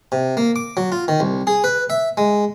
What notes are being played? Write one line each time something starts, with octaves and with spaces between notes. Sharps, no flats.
C3
A#3
D6
F#3
F4
D#3
C2
G#4
B4
E5
G#3